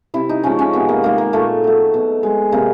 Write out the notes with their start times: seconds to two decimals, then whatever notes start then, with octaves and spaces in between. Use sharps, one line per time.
0.14 C3 E4
0.29 D#4
0.44 F3 G#3 C#4
0.59 C#4
0.73 C3 B3
0.89 A#3
1.03 D#3 G#3 A#3
1.18 A#3
1.33 A#2 A3
1.64 F#3 A3
1.94 B2
2.23 G#3
2.52 C3 A#3